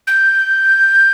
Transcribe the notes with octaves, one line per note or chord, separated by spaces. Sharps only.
G6